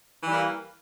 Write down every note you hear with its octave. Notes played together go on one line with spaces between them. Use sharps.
E3 G3 A#3